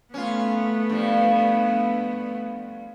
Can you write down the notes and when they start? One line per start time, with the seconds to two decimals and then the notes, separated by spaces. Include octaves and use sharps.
0.14 A3 B3 C#4 F4
0.90 G2 F3